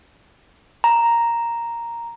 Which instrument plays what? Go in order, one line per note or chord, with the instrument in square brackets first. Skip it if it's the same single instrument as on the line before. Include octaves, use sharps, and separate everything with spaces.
[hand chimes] A#5